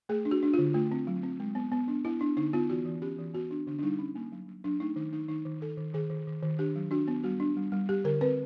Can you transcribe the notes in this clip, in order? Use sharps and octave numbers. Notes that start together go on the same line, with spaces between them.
A3 G#4
D4
F#4
D4
F4
D3
A3 F4
C4
F#3
C4
G#3
B3
B3
D4
B3 E4
D4
D3 D#4
B3 F4
E3 F#4
E3
C#4 G4
E3
B3 F#4
D4
D3 D4
D4
G3 D#4
C#4
A#3
F#3
F#3
F#3 D4
A3 D#4
D#3 D#4
D#3 D#4
D#3 D#4
D#3
D#3 A4
D#3
D#3 G#4
D#3
D#3
D#3
D4 G4
F#3
D4 F#4
B3
G3 F#4
D4
G3
G3
G3 G4
D3 A#4
C4 B4